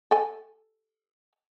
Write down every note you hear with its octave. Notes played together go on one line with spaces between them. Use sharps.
A4 G#5